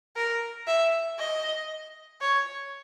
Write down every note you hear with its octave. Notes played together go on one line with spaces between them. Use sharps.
A#4
E5
D#5
C#5